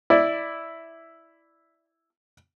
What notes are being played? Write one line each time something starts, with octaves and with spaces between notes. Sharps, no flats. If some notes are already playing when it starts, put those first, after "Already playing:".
E4 D5